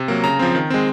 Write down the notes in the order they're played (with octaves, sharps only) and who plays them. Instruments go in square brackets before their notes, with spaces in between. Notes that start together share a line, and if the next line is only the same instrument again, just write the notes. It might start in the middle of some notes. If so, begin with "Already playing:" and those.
Already playing: [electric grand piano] C3
F#3 A#3
C#3 A#5
F3 C4
D#3
G#3 C4